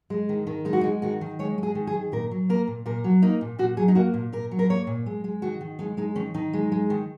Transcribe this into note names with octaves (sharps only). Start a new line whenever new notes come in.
G#3
D#3
D#3
G#3 D#4
F#4
G#3 D#4
D#3 F#4
D#3
G#3 C#5
G#3
G#4
D#3
G#4
D#3
A#2 A#4
F#3
A#3 A#4
A#2
A#2 A#4
F#3
A#3 D#4
A#2
A#2 F#4
F#3 G#4
D#4
A#3 F#4
A#2
A#2 A#4
F#3
A#4
A#3 C#5
A#2
G#3
G#3
D#3 F#4
D#3
G#3 D#4
G#3 D#4
D#3 C#4
D#3 D#4
G#3
G#3
D#3